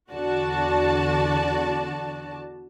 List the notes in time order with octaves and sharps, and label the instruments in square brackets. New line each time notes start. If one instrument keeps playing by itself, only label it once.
[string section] E2 D3 F#4 D5 A5